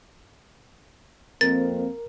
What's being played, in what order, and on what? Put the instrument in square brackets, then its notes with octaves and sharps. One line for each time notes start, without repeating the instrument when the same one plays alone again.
[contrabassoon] F2 [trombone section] A#3 C4 [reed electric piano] A#4 [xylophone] A6